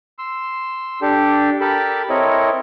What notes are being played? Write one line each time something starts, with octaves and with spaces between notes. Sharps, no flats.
C6 E6
D4 G4 A4
G4 A4 A#4 A5 B5
C4 E4 A4 A#4 C#5 D#5